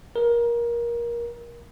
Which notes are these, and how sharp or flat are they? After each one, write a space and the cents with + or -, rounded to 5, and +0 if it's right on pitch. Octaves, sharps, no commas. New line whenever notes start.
A#4 +20